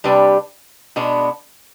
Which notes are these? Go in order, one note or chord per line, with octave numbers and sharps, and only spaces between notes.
C3 G3 D4 G4 B4
B2 G#3 B3 D4